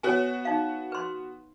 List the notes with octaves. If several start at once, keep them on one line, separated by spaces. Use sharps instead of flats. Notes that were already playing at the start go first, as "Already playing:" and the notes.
B3 F#4 C#5 G#5
D#4 F5
B4 C6